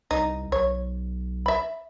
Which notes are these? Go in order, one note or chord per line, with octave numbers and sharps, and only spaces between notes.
C2 D#4
B1 C#5
E5 B5